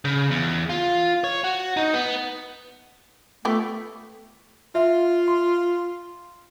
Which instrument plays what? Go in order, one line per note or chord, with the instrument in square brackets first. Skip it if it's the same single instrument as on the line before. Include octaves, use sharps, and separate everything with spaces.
[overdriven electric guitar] C#3
E2
F4
C#5
F#4
D#4
B3
[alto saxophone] A3 [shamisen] B3 F4 G4
[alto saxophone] F4 [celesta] E5
[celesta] C6